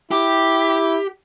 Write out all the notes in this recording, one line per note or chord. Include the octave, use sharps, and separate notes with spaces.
E4 G4 D6